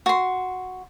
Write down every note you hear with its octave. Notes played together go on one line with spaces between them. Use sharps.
F#4 C6